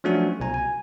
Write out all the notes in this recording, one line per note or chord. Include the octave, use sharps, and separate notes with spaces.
F3 F#3 A3 C#4 D4 F#4
C2 B2 G#5 A#5
G#5